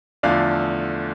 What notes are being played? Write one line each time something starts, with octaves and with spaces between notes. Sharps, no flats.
E2 D3 F3 A3 D5 F5